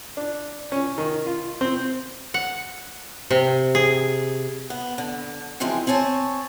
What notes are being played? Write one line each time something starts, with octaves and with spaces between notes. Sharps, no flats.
D4
C#4
D#3
F4
C4
F#5
C3
G#4
B3
D3
C#3 E3 F3 G#3 C4
C4 C#5 G#5 A5